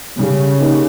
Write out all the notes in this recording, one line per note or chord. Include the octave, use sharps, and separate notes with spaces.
C#3 G3
A#3 D#4 G4